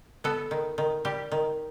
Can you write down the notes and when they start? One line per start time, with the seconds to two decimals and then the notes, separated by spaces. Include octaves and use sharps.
0.24 B3 A4
0.51 D#3
0.78 D#3
1.05 G3 G4
1.32 D#3